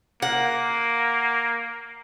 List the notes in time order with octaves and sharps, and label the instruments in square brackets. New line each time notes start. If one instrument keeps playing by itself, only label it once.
[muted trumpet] A#3 [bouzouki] F#5